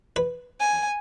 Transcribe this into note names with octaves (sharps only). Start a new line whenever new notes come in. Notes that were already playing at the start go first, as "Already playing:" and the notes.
B4
G#5